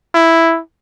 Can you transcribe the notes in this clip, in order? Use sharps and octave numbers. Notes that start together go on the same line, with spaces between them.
E4